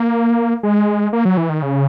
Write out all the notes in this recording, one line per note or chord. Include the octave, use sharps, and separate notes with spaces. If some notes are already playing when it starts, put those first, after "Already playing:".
Already playing: A#3
G#3
A#3
F#3
E3
D#3
C#3